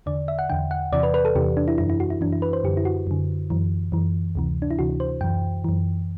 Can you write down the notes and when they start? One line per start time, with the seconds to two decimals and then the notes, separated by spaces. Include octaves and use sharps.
0.06 E2 D3 D5
0.28 E5
0.39 F#5
0.50 E2 D3 G5
0.71 F#5
0.92 E2 C3 E3 D5
1.03 B4
1.14 B4
1.25 A4
1.35 E2 C3 E3 G4
1.57 D4
1.68 E4
1.78 F#2 E3 E4
1.90 E4
2.00 F#4
2.10 E4
2.21 F#2 E3 D4
2.32 E4
2.42 B4
2.53 C5
2.64 F#2 D3 G4
2.77 E4
2.85 F#4
3.07 F#2 D3
3.50 F#2 E3
3.92 F#2 E3
4.35 D2 C3 E3
4.62 D4
4.71 E4
4.79 D2 C3 E3 F#4
5.00 C5
5.21 F#2 E3 G5
5.64 F#2 E3